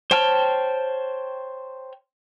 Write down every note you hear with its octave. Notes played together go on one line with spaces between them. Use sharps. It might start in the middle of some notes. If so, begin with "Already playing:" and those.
C5 C#5 G5 A5 F6